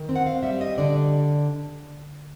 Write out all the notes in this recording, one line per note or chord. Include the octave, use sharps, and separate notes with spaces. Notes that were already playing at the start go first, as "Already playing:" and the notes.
Already playing: D#3
C4
F#5
F5
G3 E5
D#5
D3 D5